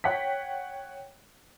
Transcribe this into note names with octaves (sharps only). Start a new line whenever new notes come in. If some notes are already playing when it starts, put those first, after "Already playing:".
C#5 F#5 G5 B6